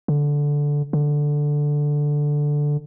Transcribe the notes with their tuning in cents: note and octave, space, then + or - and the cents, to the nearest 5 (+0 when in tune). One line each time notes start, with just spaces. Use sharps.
D3 -10
D3 +0